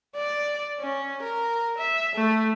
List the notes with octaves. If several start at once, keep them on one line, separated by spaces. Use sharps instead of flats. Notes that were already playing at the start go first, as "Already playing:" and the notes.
D5
C#4
A#4
E5
A3